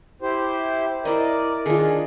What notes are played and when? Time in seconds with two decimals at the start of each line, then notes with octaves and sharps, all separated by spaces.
0.22 E4 G4 C5
1.05 E4 A#4 D5 D#5
1.66 D#3 D4 F4 G#4